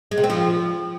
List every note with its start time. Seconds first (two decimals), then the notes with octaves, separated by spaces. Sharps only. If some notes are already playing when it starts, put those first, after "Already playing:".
0.11 G#3
0.17 C3
0.24 C4
0.30 F3